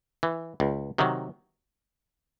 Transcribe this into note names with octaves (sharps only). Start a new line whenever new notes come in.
E3
C#2
C3 D#3 F#3